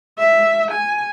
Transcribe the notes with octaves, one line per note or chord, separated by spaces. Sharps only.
E5
G#5